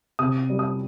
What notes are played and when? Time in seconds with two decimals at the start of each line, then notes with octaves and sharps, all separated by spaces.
0.19 C3 D#6
0.50 G3
0.59 D#6